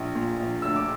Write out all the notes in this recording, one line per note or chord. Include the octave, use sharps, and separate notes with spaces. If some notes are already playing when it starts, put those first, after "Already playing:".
Already playing: A#1
A#2
A#1
D2 E6
D6